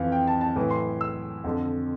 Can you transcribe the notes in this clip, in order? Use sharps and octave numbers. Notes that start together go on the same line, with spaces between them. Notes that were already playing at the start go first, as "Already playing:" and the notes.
Already playing: F2 E3 F5
G5
A5
A5
A2 E3
C6
E6
F2 D3